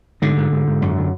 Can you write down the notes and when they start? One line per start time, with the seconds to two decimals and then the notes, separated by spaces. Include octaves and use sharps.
0.22 G#2 D3
0.37 G#2
0.52 G#2
0.68 G#2
0.82 F#2
0.97 D3